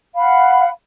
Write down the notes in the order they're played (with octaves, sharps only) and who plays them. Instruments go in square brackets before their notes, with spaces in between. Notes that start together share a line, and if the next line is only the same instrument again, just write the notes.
[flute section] F5 F#5 B5